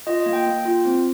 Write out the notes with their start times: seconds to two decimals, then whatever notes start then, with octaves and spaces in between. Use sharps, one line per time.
0.07 F4 D#5
0.20 D#5
0.26 A#3
0.33 G5
0.46 A#3
0.65 F4
0.85 C4